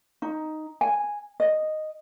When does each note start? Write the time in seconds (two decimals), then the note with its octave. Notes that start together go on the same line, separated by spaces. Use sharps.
0.22 D#4
0.81 G#5
1.40 D#5